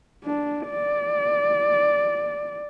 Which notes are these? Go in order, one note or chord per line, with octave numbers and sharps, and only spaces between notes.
D4
D5